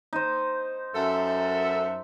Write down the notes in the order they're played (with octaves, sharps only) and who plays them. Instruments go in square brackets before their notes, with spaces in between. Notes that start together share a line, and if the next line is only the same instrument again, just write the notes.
[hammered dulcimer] D#4 C5
[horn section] F#2 A4 E5